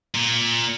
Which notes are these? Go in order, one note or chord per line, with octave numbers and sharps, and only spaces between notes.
A#2